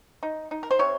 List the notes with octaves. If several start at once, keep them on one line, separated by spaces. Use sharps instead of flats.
D#4
D#4
A#4
C5
C3 C#5